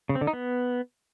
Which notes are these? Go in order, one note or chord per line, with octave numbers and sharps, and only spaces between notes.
C#3
C4
D3
D#4
B3